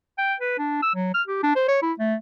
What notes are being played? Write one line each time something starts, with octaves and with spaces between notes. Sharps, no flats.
G5
B4
D4
E6
F#3
F6
G4
D4
C5
C#5
E4
A3